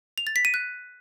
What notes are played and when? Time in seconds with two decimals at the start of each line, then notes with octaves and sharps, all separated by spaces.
0.18 F7
0.27 A6
0.36 B6
0.45 D#7
0.54 F#6